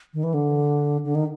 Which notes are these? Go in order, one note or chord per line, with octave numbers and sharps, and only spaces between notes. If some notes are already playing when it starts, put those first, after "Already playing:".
D#3
E3
D3
D3
D#3